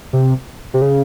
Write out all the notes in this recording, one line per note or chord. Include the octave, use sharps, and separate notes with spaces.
C3
C3
C#3